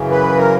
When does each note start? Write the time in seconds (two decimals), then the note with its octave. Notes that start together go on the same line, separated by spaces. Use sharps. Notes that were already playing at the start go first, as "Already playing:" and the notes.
Already playing: F#2 C#3 E3
0.11 B4
0.37 A#4